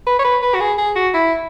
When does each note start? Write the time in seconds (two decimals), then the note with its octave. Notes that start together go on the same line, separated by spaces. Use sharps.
0.06 B4
0.19 C#5
0.24 B4
0.42 B4
0.54 F#4
0.60 G#4
0.78 G#4
0.96 F#4
1.14 E4